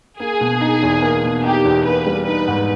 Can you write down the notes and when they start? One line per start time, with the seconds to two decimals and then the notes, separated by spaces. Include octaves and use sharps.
0.19 A#3 G#4
0.41 B2
0.61 D#4
0.82 E2
1.02 A#3
1.23 B2
1.44 D#4 G4
1.64 E2
1.85 A#3 B4
2.06 G3
2.27 D#4 B4
2.48 G#2